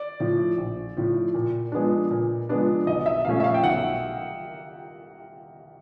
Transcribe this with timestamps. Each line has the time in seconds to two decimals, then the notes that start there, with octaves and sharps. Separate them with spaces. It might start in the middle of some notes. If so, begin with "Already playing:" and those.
Already playing: D5
0.20 A2 F3
0.57 A#1
0.97 A2 F3
1.34 A#2
1.72 F3 G#3 B3 D4
2.10 A#2
2.49 F3 G#3 B3 D4
2.87 B1 D#5
3.06 E5
3.25 A#2 F3 A3 C#4 F5
3.40 E5
3.44 F5
3.54 G5
3.64 B1 F#5